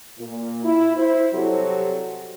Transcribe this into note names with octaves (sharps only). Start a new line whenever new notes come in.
A#2
E4
E4 C5
C3 F#3 G3 C4 F#4 A4